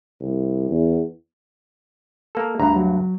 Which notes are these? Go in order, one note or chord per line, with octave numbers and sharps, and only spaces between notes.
C2
E2
A#3 A4
D2 G2 A#5
F#3